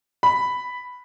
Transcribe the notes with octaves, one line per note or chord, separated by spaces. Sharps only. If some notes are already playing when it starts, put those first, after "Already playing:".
B5